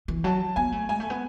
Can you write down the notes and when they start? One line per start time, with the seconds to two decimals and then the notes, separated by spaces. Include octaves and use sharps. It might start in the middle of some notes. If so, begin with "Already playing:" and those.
0.08 E3
0.24 F#3 A5
0.56 B3 G#5
0.72 A3
0.89 G#3 G#5
1.00 A3
1.10 B3